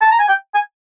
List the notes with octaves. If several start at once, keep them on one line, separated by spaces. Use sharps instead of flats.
A5
A#5
G#5
G5
G#5